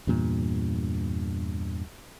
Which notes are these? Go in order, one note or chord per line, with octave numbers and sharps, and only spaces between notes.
E2 G2 A#2